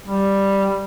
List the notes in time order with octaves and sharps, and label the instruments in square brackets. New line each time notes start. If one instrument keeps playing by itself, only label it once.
[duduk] G3